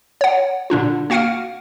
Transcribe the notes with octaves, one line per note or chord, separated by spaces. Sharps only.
C#5 F#5
A#2 D3 D4 F4
A#3 F#4 F5 F#5 F6 D7